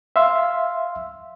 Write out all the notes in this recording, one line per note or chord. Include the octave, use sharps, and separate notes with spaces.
E5 F5 C6 E6